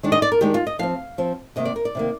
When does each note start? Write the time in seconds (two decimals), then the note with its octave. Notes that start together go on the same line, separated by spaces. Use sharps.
0.03 D#3 G#3 D4
0.12 D#5
0.22 D5
0.32 A#4
0.41 D#3 G#3 D4 G4
0.54 F4
0.67 D#5
0.79 F3 C4 F5
1.18 F3 C4
1.56 C3 D#3 A#3 D#5
1.65 D5
1.76 A#4
1.85 D5
1.95 C3 D#3 A#3